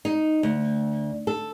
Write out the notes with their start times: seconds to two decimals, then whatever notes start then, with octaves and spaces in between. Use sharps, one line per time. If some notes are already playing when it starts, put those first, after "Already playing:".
0.05 D#4
0.43 D2
1.27 A4